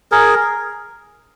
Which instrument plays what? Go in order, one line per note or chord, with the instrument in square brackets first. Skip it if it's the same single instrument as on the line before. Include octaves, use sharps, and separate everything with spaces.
[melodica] G#4 A#4